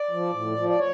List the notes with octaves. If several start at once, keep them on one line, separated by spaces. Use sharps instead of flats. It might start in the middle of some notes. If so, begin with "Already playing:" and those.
Already playing: D5
F3
A2
F3
D5
C#5